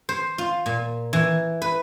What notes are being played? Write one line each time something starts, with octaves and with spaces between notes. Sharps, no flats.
C5
F4
A#2
E3
B4